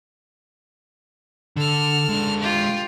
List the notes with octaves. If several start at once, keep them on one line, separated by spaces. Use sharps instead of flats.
D3 A4 F6
G#3 D4
F4 G4